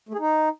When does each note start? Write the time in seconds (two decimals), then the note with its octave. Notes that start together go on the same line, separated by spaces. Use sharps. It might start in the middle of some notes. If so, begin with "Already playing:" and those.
0.09 A3
0.14 G#4
0.19 D#4